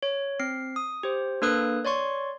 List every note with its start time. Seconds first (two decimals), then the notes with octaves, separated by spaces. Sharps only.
0.03 C#5
0.40 C4 C7
0.76 D#6
1.03 G4 C5
1.42 A#3 D4 A4 B4 D#6 F#6
1.85 C#5 D5 C6 C#6